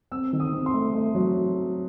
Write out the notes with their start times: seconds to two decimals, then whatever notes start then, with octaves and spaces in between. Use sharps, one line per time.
0.12 C4 E6
0.33 D#3
0.40 D#6
0.53 C4
0.66 C6
0.74 A3
0.94 A3
1.15 F#3